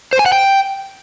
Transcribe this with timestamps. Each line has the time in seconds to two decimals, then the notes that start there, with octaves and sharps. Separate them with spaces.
0.13 C5
0.19 G#5
0.26 F#5
0.32 G5